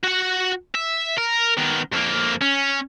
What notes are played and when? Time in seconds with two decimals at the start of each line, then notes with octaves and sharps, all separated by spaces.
0.04 F#4 F#5
0.75 E5
1.18 A#4
1.57 D#3 B3
1.92 F2 A#3
2.41 C#4